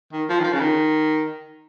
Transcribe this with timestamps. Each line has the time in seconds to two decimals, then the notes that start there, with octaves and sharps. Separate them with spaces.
0.13 D#3
0.29 F3
0.40 D#3
0.44 F3
0.53 C#3
0.60 D#3